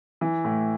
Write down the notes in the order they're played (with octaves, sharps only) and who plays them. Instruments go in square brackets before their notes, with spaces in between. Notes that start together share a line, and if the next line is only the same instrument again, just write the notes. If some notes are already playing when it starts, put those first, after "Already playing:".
[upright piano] E3
A2